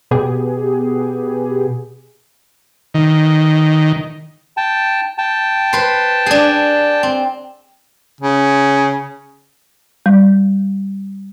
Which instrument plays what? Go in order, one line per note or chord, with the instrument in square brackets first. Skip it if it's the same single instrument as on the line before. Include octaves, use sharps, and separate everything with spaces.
[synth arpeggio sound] B2 B3 G4 G#4
[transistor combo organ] D#3
[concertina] G5 A5
G5 A5
[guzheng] B4 C5
D4 G#4
C4
[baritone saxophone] C#3
[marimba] G3